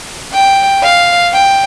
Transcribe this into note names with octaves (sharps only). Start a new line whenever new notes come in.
G5
F5
G5